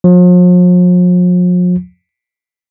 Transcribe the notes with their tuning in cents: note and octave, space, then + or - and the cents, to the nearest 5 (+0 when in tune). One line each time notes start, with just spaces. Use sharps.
F3 +45